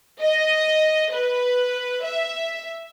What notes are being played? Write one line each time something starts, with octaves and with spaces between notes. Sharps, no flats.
D#5
B4
E5